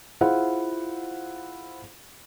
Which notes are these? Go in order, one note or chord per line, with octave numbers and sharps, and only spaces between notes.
E4 F4 G#4 C5 F5 F#5